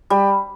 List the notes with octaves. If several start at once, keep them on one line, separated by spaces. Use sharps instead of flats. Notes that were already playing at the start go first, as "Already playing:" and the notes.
G3